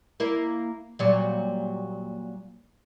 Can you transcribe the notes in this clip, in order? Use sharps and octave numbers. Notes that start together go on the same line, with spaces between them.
A#3 E4 A#4
A#2 F#3 G3